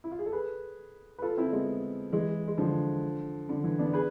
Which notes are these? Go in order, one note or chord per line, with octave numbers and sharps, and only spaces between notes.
E4
F4
G#4
A4
G#4 B4
B4
F4 A4
C4 E4
G#3 B3
E3 G#3
G#3
D3 F3
D3
E3
B3 D4
G#4 B4